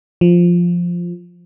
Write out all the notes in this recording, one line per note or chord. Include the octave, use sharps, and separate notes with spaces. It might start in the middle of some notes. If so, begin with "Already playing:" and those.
F3